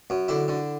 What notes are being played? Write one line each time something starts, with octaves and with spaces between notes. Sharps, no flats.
F#2
D3 E4
D3